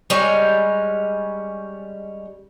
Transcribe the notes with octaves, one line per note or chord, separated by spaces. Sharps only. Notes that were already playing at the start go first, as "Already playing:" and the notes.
G3 G#3 C#4